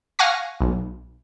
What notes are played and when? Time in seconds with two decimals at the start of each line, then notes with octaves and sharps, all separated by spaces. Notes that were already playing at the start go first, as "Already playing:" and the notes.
0.19 F5 F#5 G#5 C#6 A#6
0.61 B1